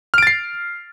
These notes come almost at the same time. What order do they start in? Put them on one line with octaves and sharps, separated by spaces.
F6 D7 A6 C7